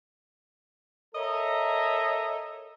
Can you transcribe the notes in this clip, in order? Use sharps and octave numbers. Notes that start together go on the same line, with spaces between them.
A4 A#4 C#5 D#5 E5 A#5